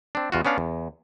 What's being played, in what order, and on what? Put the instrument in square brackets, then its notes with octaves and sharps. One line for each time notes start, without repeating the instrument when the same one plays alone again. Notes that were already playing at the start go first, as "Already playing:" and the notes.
[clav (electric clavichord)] C4 D4
E2 F4 F#4
B3 C#4 D4 F5 F#5
E2